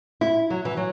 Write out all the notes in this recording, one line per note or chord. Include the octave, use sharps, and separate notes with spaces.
E4
F#3
E3
F#3